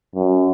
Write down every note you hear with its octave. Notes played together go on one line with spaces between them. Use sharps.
F#2